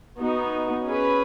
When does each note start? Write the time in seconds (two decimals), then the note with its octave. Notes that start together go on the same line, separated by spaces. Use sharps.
0.18 B3 D#4 F#4
0.86 C#4 G#4 B4